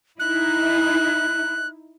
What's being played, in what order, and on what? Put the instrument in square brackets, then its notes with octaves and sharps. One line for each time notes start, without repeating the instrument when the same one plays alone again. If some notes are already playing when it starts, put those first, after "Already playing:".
[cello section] D#4 E4 [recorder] F#6